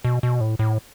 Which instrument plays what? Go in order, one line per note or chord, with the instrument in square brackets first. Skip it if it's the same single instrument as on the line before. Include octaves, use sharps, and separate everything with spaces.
[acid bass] B2
B2
A2
A2